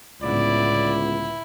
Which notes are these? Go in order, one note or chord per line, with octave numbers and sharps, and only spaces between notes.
C#2 A2 D3 B3 E4 D5